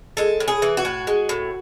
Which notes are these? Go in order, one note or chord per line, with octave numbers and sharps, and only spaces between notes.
G#3 A4
A2
G#4
E3
F#4
A2
G#3
A2